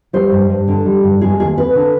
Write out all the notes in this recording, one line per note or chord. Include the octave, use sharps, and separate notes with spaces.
G3 C5
G2
G2
D3
G3
G2
G#3 G#4
D#2 G#4
C4 B4
D3